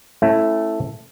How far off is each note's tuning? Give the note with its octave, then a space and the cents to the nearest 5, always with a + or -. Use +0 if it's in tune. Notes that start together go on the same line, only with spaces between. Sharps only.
A3 +0 C#4 -40 E4 +0